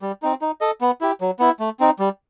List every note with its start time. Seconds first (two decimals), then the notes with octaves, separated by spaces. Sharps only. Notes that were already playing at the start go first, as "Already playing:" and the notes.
0.02 G3
0.22 C4 D#4
0.41 D#4
0.61 A4 D#5
0.81 B3
1.01 E4 G4
1.21 F#3
1.39 B3 E4
1.60 A3
1.80 C4 D#4
1.99 G3